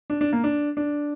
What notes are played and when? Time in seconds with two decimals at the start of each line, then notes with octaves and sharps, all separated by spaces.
0.10 D4
0.21 D4
0.33 A#3
0.44 D4
0.77 D4